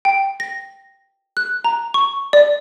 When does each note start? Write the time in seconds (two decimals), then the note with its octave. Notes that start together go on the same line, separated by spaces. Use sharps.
0.05 G5
0.40 A#6
1.37 F#6
1.64 A#5
1.94 C#6
2.33 D5